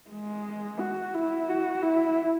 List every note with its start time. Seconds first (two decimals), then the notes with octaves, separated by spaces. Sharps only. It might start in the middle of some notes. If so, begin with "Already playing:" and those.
0.11 G#3
0.80 F#4
1.14 E4
1.49 F#4
1.83 E4